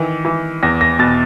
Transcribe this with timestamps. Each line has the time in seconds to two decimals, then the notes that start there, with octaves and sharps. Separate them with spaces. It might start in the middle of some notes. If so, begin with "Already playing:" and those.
Already playing: D#3 E3
0.25 E3
0.63 E2 A#6
0.81 A#6
0.99 B2 A6